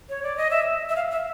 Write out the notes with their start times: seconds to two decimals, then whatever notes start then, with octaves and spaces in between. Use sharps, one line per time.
0.09 C#5
0.23 D5
0.37 D#5
0.51 E5
0.89 E5
0.96 F5
1.11 E5